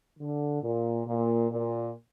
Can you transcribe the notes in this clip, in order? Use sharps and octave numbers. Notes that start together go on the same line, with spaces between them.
D3
A#2
A#2
A#2